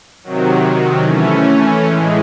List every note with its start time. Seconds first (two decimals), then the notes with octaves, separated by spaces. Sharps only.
0.23 C3 D#3 F#3
1.04 E3 A3 C#4
1.85 A2 E3 G#3